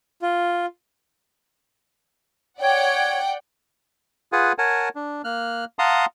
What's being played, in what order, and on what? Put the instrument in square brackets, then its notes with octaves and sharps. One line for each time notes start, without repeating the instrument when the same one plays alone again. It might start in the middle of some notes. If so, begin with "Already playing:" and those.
[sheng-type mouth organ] F4
[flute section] C#5 [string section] D5 F#5 G5
[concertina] F4 G#4 B4 F#5 G#5
A#4 C#5 F#5 G#5 A5
D4
A#3 F6 F#6
F5 F#5 A5 A#5 C6 D#6